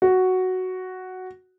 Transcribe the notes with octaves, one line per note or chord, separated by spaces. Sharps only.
F#4